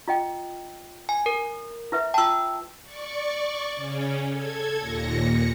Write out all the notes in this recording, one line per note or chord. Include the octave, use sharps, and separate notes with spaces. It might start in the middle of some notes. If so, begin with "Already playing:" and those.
F4 D#5 G5
G#5
A#4
E4 B4 E5
F4 G5 A5 E6
D5 C#6
C#3 C#4
A4 G#6
D#2 A#2 A#6 C#7